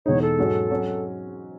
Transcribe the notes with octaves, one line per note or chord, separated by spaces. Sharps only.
E2 B2 G#3 D#4 C#5
A4
G#2 F#3 C#4 F#4
F#3 C#4 F#4